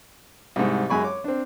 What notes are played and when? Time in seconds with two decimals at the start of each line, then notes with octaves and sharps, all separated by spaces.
0.56 C2 G#2
0.90 F#2 G#3 G#5 B5 C#6
1.04 C#5 D6
1.24 C4 D4